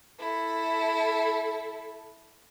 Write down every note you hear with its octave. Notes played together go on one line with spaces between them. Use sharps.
E4 A4